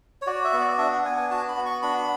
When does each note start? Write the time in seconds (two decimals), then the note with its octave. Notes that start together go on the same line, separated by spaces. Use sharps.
0.22 C#5
0.27 F#4 D5
0.44 E5
0.53 B3
0.61 D5
0.78 D4 E5
0.92 F#5
1.04 B3 G#5
1.17 G#5
1.31 F#4 A5
1.48 B5
1.57 B3
1.66 C#6
1.82 D4 B5